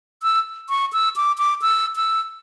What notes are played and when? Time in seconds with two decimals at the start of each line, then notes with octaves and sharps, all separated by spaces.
0.23 E6
0.69 C#6
0.93 E6
1.16 D6
1.38 D6
1.62 E6
1.96 E6